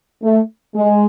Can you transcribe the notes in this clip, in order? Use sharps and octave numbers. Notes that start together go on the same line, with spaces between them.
A3
G#3